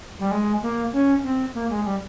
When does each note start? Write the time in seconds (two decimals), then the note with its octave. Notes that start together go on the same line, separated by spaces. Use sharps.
0.19 G3
0.31 G#3
0.62 A#3
0.93 C#4
1.24 C4
1.54 A#3
1.70 G#3
1.85 G3